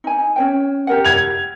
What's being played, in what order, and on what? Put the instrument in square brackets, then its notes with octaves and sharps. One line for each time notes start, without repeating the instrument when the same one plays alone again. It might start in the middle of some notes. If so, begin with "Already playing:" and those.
[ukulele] D#4 G#5
C#4 C#5 G5
G4 A#4 F#5
[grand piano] G#6 F7